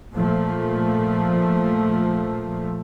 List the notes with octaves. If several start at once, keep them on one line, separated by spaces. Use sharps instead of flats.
A#2 F3 A3